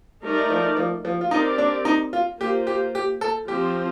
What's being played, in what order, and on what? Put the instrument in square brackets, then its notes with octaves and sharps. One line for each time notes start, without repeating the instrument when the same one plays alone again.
[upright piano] G3 [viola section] A3 D#4 A#4 D5
[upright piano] F3
F3
F3
F4
[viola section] C4 G4 A#4 D5 [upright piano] D#4
[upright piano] D4
D#4
F4
[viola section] A#3 F4 C5 [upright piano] G4
[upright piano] G4
G4
A4
[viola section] F3 C4 F4 C5 [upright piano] G4